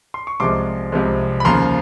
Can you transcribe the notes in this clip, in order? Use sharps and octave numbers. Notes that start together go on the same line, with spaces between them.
C6
C#6
C2 C3 F3 G#3 C6 D6
C2 C3 F3 G#3
B5
D#2 C#3 F3 A#5 C6